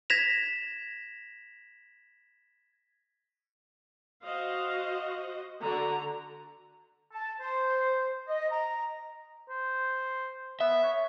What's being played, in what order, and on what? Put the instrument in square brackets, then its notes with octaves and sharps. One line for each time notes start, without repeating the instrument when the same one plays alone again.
[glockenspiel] G#6 A#6 B6 E7 F7
[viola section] F#4 C5 D#5 [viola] F5
[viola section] D3 F#4 [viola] A#5
[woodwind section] A5
C5
D#5
A#5
[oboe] C5
[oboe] B3 [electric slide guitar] E5
[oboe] C#5